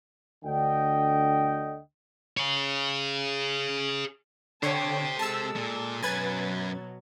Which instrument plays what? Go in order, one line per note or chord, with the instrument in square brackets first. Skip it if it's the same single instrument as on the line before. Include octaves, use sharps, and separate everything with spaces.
[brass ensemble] D2 D3 D#5 G5
[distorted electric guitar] G#4 C#5
[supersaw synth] D3 C#5 [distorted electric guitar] G4 C5 [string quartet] G5 A5 D#6
[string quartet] G#3 A4 [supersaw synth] A5 E6
[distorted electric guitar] A#2
[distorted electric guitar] F#2 G#5 [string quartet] B2 F#3 [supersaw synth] B4 G#6 A6